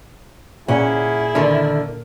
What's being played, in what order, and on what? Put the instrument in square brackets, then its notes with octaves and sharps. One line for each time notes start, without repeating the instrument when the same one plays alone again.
[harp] A#2 [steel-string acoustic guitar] C#4 F#5 [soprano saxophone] E4 [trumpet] G#4
[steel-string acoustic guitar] D3 D#3 [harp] A#4